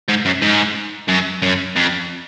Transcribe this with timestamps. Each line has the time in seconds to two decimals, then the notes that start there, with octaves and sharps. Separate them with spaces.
0.09 G#2
0.26 F#2
0.42 G#2
1.08 F#2
1.42 F#2
1.76 F2